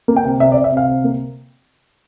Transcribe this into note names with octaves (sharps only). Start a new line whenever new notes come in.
A#3
G5
C3
C3 E5
D5
C3
E5
C3 F5
C3
A#3